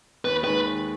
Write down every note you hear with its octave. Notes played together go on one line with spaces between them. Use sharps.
D#2 B4
D#3 G#3 B4